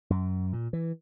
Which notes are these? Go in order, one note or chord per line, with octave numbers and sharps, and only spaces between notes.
F#2
A#2
E3